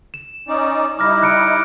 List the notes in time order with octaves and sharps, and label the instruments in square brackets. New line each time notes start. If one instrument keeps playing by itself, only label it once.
[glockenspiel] E7
[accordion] C#4 D#4 D5
[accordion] G3 D#4 E4 [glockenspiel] D6 F6 A#6
[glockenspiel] F#6 C#7 D7